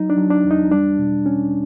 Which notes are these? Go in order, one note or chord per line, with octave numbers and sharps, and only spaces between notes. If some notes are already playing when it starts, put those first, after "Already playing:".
Already playing: F#3 D#4
D4
F#3
D4
E2
D#4
G3 D4
B2
C#4